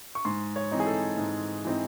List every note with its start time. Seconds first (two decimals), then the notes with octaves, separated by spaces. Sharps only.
0.15 C#6
0.25 G#2 C6
0.56 C#5
0.72 E3 C4 D#4
0.80 G#4
0.87 A4
1.18 G#2
1.65 E3 C4 D#4